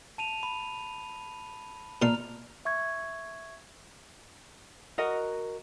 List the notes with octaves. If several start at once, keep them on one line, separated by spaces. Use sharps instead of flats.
A5 D#7 F7
B5
A#2 A5 A#5 C6 F6 F7
E5 C#6 G#6
F#4 A#4 D#5 F#5